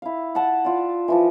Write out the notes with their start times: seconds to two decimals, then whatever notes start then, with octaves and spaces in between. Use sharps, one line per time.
0.02 E4 F5
0.35 F#5 A5
0.65 F4 D5
1.08 E3 F3 F4